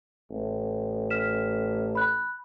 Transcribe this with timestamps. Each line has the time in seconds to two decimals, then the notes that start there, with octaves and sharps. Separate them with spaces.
0.30 A1
1.10 F6 B6 E7
1.95 B5 F#6